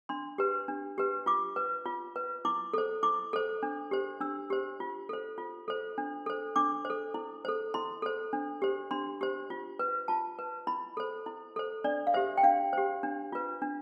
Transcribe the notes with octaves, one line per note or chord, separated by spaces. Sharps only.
D4 C6
G4 B4
D4
G4 B4
F4 D6
B4
F4
B4
E4 D6
A4 C5
E4 D6
A4 C5
D4
G4 C5
D4 E6
G4 C5
F4
A4 C5
F4
A4 C5
D4
A4 C5
D4 D6
C5
A4
E4
A4 C5
E4 C6
A4 C5
D4
G4 C5
D4 C6
G4 C5
F4
B4
F4 A5
B4
E4 B5
A4 C5
E4
A4 C5
D4 D5
F5
G4 C5 E5
G5
D4 F5
G4 C5
D4
F4 B4
D4